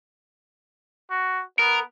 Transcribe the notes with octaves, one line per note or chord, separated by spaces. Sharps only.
F#4
B3 A#4